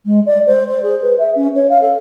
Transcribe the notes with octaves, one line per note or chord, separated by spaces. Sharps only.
G#3
D5
C5
C5
G#4
B4
E5
C#4
C#5
F5
A4